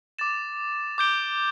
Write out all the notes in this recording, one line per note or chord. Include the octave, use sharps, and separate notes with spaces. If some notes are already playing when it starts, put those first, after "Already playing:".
D6 A6 E7
D6 G6 D7 G7